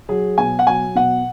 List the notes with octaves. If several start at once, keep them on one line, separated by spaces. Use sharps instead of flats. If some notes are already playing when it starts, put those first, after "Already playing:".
F#3 G#4
B2 G#5
F#5
F#3 G#5
B2 F#5